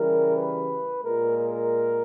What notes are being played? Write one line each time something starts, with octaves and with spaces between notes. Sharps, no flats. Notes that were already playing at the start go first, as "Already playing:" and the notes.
Already playing: C#3 E3 G3 A#4
B4
A#2 G#3 A#4
A#4